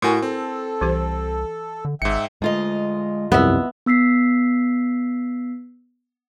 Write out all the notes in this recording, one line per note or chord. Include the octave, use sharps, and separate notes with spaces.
A2 E4 F#4 A#4 G#5
C4 A4
C2 E3 G4 C5
D3
G#1 G#2 E5 G5 C#7
D2 G#3 F4 D#5
C2 F#2 F3 B3 E5
B3 E6 B6 C7